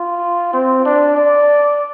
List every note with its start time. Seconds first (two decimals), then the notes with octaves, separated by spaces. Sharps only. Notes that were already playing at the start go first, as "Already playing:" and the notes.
Already playing: F4
0.53 C4
0.85 D4
1.17 D5